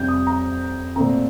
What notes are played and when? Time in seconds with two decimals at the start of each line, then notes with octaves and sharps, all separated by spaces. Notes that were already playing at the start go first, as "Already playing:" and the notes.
Already playing: F2 C3 G3 G6
0.08 D#6
0.27 A#5
0.96 A#2 A3 C4 A#5